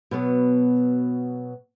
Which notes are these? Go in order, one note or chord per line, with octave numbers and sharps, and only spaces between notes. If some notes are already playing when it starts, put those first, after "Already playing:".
B2 F#3 B3